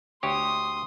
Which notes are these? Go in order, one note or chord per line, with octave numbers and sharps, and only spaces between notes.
D2 G4 C#5 C6 D#6